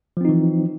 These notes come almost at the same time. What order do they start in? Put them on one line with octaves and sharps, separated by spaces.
F3 C4 D#4 E3